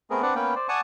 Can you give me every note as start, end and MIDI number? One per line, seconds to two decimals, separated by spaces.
0.10 0.22 57
0.10 0.22 59
0.10 0.22 60
0.10 0.22 68
0.10 0.22 70
0.22 0.35 60
0.22 0.35 62
0.22 0.35 71
0.22 0.35 74
0.22 0.35 78
0.35 0.54 58
0.35 0.54 59
0.35 0.54 61
0.35 0.54 71
0.35 0.54 79
0.55 0.68 72
0.55 0.68 74
0.69 0.81 74
0.69 0.81 78
0.69 0.81 80
0.69 0.81 81
0.69 0.81 85
0.69 0.81 87